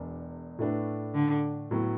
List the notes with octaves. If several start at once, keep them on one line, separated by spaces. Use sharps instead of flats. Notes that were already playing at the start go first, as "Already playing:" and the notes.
Already playing: E1 E2 D4
A2 A3 D4 B4
D3
A2 F#3 B3